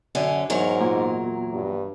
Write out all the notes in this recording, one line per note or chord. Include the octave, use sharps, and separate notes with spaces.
F#2 D3 C#4
E2 G#2 F#3 A#4
A#2
G2